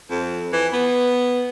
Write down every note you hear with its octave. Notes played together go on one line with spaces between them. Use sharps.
F2
E3
B3